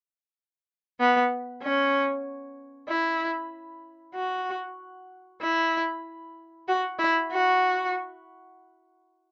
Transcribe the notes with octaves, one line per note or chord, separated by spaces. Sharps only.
B3
C#4
E4
F#4
E4
F#4
E4
F#4